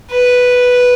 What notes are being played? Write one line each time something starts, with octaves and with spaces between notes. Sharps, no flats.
B4